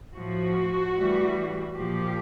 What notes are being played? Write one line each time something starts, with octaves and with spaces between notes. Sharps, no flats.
A2 F3 F#4
A2 E3 G3
A#2 F3 G4